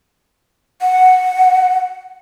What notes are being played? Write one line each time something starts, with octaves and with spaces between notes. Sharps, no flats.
F#5